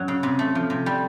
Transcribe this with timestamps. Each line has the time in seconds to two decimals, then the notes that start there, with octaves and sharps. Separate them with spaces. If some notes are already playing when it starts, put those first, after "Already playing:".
Already playing: F#2 F#3
0.08 C#3
0.23 C3
0.39 A3
0.55 F3
0.70 C3
0.86 G3